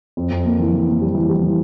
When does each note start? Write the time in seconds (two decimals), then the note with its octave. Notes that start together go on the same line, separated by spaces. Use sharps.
0.17 F2
0.31 F2
0.45 A#3
0.59 E3
0.73 E3
0.88 A#3
1.01 G3
1.15 E3
1.29 G3
1.43 E3